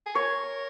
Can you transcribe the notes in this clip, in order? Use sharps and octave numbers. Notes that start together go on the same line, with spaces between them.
G#4
A#4 C#5